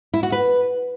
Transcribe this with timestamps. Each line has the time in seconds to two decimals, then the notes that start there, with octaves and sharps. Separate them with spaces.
0.14 E4
0.23 F#4
0.32 B4